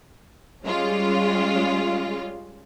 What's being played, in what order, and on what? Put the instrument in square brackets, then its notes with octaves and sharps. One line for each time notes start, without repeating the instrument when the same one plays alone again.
[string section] G3 G#3 C#4 F4